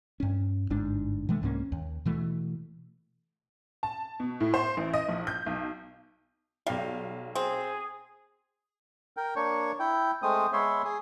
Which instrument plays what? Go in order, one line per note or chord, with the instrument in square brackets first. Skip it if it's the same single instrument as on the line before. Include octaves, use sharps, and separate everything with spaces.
[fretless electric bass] G2 C#4
G1 G#2 D4
B2 E3 G#3 A3
C2 G#2 A#3 C#4
D#2
B2 E3 A3
[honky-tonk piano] A5
B2
A2
C5
A1
D#5
A#1
G6
B1
[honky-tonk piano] B1 F5 [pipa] G3
[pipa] C4 [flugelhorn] G#4
[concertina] A#4 G5
A#3 D4 C#5 C#6
E4 G5
G#3 A3 C4 C5 D#6
G#3 B3 C#5 E5 C6
G#4